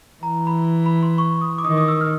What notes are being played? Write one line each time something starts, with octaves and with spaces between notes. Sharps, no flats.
E3 A#5
B5
B5
C6
C#6
D#6
D6
D#3 D#6
D#6
E6
F6